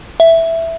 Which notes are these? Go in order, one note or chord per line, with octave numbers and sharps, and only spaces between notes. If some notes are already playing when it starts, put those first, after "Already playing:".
E5